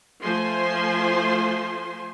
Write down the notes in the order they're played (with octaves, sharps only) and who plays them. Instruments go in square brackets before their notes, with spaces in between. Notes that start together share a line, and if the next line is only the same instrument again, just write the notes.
[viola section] F3 A3 C5 G#5 C6